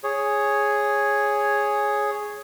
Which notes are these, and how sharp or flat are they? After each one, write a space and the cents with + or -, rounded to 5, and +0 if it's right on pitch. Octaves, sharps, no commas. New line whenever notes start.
G#4 +0 C#5 +0